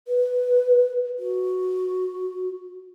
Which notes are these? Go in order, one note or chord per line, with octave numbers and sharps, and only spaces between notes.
B4
F#4